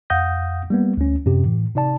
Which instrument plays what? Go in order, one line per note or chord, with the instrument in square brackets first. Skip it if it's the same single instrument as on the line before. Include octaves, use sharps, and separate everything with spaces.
[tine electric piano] F2 F5 F#5 D#6 G6 A#6
G3 A#3 B3
D2 C#4
F#2 C3 G4
A2 E3
C3 D#4 D5 A5